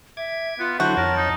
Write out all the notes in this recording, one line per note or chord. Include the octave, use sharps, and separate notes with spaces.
E5 D6 G#6
B3 F4
D3 F#3 E4 F#4 C5 A5
F2 A#4 C#5 A6
D#4